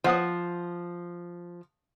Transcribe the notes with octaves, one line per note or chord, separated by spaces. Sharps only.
F3 C5 F#5 D#6